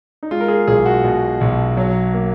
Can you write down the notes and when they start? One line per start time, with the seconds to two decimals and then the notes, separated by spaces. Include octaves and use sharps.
0.23 D#4
0.31 G#3 F4
0.41 A#4
0.48 G#4
0.67 B1 G#4
0.86 F#4
1.04 B2
1.41 B1
1.77 F#3
2.14 A#3